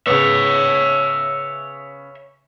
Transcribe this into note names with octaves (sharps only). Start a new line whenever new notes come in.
C#3 B3 C#5 E5